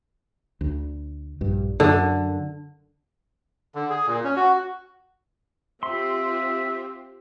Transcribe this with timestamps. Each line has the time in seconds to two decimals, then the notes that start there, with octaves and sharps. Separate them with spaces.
0.61 D2
1.41 A#1 G2
1.80 F#2 D3
3.75 D3
3.90 G#4
4.07 A#2
4.24 C#4
4.36 F#4
5.83 C4 F4 G4 E5 C6